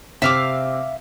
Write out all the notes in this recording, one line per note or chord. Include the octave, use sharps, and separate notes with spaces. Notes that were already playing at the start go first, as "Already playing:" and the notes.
C3 C4 E5 F5 D6